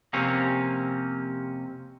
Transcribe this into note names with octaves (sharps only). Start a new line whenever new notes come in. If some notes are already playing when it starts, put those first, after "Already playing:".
F2 C3 A#3 C4 C#4